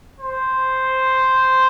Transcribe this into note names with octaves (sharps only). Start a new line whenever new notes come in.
C5